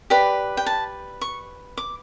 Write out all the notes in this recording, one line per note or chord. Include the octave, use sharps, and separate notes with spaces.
G4 B4 D5 B5
G5
A5
C#6
D6